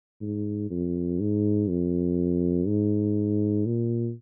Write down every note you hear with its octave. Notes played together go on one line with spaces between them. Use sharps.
G#2
F2
G#2
F2
G#2
A#2